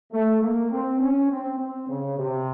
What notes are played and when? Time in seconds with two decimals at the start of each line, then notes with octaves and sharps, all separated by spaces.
0.12 A3
0.42 A#3
0.71 C4
1.00 C#4
1.30 C4
1.59 C4
1.89 C#3
2.18 C3